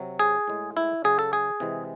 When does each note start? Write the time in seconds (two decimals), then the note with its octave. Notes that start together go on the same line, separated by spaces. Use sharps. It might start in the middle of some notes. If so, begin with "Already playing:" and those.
Already playing: C3 F#3
0.19 G#4
0.48 A2 G#3
0.77 E4
1.04 C#3 F#3 G#4
1.19 A4
1.33 G#4
1.60 C3 E3 G#3